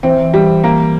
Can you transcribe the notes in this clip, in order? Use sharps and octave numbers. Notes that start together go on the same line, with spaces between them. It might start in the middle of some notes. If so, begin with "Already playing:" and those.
E3 C4
G3
A#3